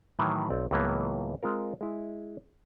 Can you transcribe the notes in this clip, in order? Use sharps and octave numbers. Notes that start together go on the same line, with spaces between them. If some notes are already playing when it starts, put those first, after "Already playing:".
A2 D#3 E3 F#3
B1 C4 D5
C#2 A2 E3 F#3 A#3 B3
G#3 C4 F4 A#4
G#3 E4